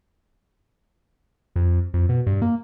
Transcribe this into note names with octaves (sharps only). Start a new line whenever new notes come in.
F2
F2
B2
G2
A#3